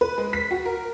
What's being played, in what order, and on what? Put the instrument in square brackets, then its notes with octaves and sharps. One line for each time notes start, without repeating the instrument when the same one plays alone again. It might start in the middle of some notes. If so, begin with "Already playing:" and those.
[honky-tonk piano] B4
G#3
B6
F#4
A#4